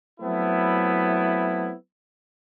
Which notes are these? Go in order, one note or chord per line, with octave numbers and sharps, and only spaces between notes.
F#3 A3 B3 C4 E4